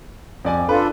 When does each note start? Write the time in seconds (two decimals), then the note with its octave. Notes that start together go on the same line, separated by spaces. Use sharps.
0.45 F2 D5 G#5
0.69 D4 F4 A4 B4